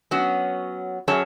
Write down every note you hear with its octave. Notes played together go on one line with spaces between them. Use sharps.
F#3 B3 C#4 F#4
F#2 F#3 C#4 G#4 C#5 A5